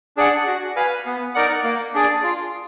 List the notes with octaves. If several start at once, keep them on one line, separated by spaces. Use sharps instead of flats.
D4 G#4 D5 F#5
F#4
B4 F5 G#5
B3
D#4 A#4 D5 F#5
A#3
D4 G#4 D5
F4